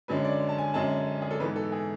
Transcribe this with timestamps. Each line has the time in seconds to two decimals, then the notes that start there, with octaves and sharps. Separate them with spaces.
0.08 F#2 D3 G#3 C#4 B4
0.25 D5
0.49 A5
0.58 G#5
0.74 F#2 D3 G#3 C#4 A5
1.22 G#4
1.31 A4
1.40 G#2 E3 B3 B4
1.56 A4
1.72 G#4